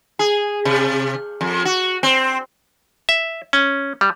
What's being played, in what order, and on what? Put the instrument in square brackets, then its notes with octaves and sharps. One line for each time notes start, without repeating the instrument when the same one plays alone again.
[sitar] G#4
C3
F2
F#4
C4
[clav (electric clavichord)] E5
C#4
G3